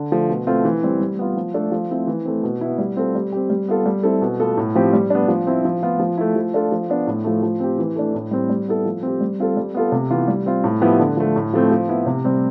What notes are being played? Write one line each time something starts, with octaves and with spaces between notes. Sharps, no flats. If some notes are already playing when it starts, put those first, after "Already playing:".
Already playing: D3
F3 A3
B2
A3 C4 F4
E3
G3 C4
G3
B3 F4
F3
A3 D4 A4
F3
A3 C4 E4
E3
A3 C4
B2
B3 E4
G3
C4 F4 A4
G3
C4 G4
G3
B3 F4 A4
G3
C4 E4 A4
B2
B3 F4 A4
A2
F3 C4 G4
G3
B3 D4
F3
C4 E4
F3
B3 F4
F3
A3 E4
F3
A3 D4 F4 A4
F3
B3 D4
A2
F3 A3
F3
C4 G4
E3
A3 D4
A2
G3 C4
G3
B3 E4 A4
F3
C4 G4
G3
C4 F4 A4
G3
B3 F4 A4
C3
E3 B3 F4
G3
C4 F4
A2
F3 B3 E4 G4
D3
F3 A3
A2
F3 A3 C4
F3
B3 E4
C3
G3 C4